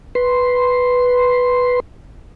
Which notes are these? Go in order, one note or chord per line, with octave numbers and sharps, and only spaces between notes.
B4 C6